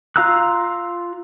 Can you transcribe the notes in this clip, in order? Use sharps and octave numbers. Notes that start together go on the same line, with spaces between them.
F4 F5 A#5 E6 F#6